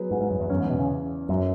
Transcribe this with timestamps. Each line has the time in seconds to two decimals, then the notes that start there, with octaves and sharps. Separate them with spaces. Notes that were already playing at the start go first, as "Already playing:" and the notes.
Already playing: F#3 B3 G#4 B4
0.11 G#2
0.21 G#2
0.30 F#2
0.40 E2
0.50 F#2 C#4
0.53 E2 E3
0.60 G#2
0.70 B2
0.79 C#3
1.29 F#2 F#3 C#4